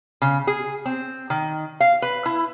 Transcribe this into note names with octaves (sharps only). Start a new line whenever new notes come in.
C#3
G#4
C4
D#3
F5
B4
E4